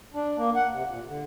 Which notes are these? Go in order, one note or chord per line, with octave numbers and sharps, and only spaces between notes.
D4
A#3
F#5
C3
A#2
D3